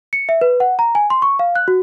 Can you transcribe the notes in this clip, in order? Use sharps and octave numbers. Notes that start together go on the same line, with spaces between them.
C#7
E5
B4
F#5
A#5
G#5
C6
C#6
F5
F#6
F#4